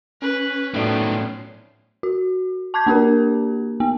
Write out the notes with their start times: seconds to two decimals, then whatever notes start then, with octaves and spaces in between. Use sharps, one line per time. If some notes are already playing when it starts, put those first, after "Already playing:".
0.22 C#4 B4
0.74 A2 D#3 F3 F#3 B3 C5 D5
2.03 F#4
2.74 A5 D6 G6 G#6
2.87 A#3 D4 G4 A#4
3.80 B3